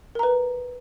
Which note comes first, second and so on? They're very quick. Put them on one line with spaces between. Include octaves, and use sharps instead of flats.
A#4 A#5 B4